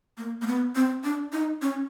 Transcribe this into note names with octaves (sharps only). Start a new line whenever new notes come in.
A#3
A#3
B3
C4
D4
D#4
C#4